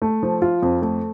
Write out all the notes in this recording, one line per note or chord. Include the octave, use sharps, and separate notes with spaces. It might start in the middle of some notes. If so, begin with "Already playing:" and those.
A3
F3
F4
F2
A3